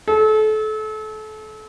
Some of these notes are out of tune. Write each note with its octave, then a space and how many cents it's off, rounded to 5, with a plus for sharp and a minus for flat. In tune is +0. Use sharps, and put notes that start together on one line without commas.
A4 -30